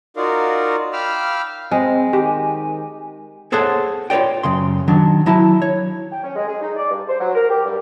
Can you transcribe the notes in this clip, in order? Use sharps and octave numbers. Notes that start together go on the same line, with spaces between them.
D#4 F4 F#4 A#4 D5 F5
F5 G5 B5 D6 E6 F6
G#3 C4 G#5
D#3 G4
G#4 A4 C5 C#5 F#5
F4 B4 C#5 D5 G5
F#2 C#3 C6
D#3 F#3 D4
F#3 E4 A5
C#5
G5
C#4
G#3
G#4
D#4
D5
G2
C5
F#3
A#4
G4
G2